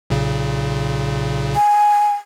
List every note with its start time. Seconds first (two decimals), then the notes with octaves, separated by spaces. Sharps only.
0.10 B1 A#2 C#3
1.55 G#5